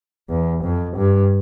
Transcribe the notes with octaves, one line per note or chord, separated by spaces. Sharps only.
E2
F2
G2